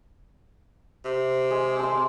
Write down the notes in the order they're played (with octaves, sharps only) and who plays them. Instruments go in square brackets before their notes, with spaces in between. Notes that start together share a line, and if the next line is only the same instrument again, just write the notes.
[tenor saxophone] C3
[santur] G#3
A5 C6